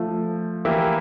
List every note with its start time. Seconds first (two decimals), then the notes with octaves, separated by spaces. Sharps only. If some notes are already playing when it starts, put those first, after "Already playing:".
Already playing: F3 A3
0.65 E3 A#3 E4 G4